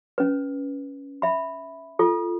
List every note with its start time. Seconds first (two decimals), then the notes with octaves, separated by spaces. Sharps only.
0.18 C#4 B4
1.22 E5 B5
1.99 F4 A4